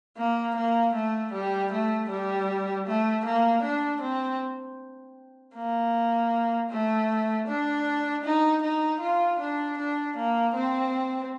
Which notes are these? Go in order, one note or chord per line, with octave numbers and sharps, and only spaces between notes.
A#3
A#3
A3
G3
A3
G3
A3
A#3
D4
C4
A#3
A3
D4
D#4
D#4
F4
D4
D4
A#3
C4